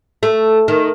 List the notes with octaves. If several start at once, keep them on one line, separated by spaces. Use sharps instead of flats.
A3
D#3